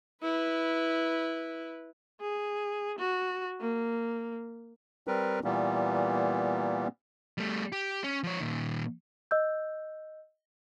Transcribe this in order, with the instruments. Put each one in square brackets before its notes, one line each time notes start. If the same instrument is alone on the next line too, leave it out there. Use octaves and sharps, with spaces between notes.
[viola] E4 B4
G#4
F#4
A#3
[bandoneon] G3 C4 A#4 B4
A#2 E3 G3 A#3 B3
[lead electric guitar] G3 A3
G4
C#4
F3 C#5
A#2 D#3
[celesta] D#5 E6 G6